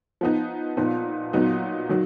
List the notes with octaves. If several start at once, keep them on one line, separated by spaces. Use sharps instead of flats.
F3 B3 D#4
A#2 F3 B3 D#4
A#2 F#3 B3 D#4
D#3 F#3